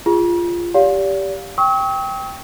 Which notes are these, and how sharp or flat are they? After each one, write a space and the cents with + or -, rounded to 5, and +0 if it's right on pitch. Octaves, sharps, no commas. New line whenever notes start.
F4 -10 G#4 -25
G4 +0 D5 -40 F5 +25
G5 +0 C#6 +0 E6 -45